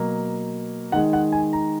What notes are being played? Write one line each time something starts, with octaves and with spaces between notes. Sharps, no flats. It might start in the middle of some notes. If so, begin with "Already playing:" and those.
Already playing: B2 F#3 A#3
D#3 G#3 F#5
F#5
G#5
A#5